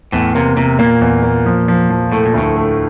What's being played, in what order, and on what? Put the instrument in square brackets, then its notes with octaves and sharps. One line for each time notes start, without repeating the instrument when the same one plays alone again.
[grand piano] E2 [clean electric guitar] A2
[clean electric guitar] C3 [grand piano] A#3
[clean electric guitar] C3 [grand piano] A#3
[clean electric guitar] A#2 [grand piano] A#3
[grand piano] E2
A#3
F3
F3
F3
[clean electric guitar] A2 [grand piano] A3
[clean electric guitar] A#2
[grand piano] D2 [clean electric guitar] A2
[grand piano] A3